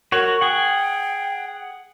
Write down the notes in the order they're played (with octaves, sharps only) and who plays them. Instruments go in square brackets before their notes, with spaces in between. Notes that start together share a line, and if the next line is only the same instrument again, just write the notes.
[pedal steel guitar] F#4 C#5 [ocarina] A#4
[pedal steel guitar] G#4 F#5 [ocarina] G5